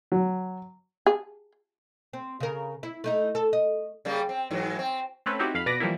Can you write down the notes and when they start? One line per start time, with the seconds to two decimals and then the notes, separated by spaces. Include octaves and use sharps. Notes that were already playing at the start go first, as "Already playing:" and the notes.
0.12 F#3
1.06 G#4
2.13 C4
2.40 C#3 A#4
2.83 E4
3.04 A3 D#4 E4
3.35 A4
3.53 D#5
4.05 C#3 G3 A#3
4.29 C4
4.51 G#2 E3 F#3
4.79 C4
5.26 A3 C4 C#4 A4 B4
5.39 C4 D#4 E4 F#4 G4
5.54 F2 F5 B5
5.66 B2 B4 D5 D6 A#6
5.80 E3 F3 G3 A#3 E4